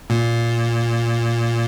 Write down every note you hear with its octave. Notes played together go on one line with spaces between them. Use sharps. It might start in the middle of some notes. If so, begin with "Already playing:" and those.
A#2